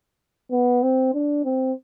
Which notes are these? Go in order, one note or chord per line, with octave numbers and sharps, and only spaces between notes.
B3
C4
D4
C4